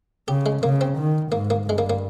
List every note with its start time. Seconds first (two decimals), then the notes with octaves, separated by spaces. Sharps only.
0.28 C#3 G4
0.46 G#3
0.63 C#3 A#3
0.81 C4
0.98 D#3
1.32 G#2 A#3
1.50 A#3
1.67 G2 G#3
1.78 A#3
1.90 A#3